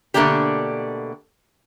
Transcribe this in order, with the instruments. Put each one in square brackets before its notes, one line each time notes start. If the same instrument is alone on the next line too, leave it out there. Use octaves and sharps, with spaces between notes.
[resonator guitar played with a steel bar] B2 D3 A3 A#3 D4 G4